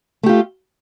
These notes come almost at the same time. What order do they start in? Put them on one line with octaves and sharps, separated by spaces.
A3 G4 F4